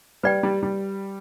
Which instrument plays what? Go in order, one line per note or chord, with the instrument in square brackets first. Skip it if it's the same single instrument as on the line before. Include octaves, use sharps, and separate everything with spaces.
[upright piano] G3 [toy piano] B4 D5 G5
[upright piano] G3
G3